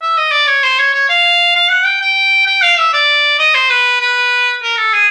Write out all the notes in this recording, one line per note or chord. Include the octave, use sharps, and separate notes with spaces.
E5
D#5
D5
C#5
C5
C#5
C#5
F5
F5
F#5
G5
G5
G5
F5
E5
D5
D#5
C5
B4
B4
A#4
A4
G#4